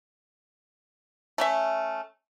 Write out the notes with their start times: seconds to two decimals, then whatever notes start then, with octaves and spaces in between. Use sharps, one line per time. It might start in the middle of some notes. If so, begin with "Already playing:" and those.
1.38 A3 C#4 E5